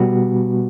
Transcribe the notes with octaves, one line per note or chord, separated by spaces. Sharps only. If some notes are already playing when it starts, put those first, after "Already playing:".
Already playing: B2 G3 B3 F#4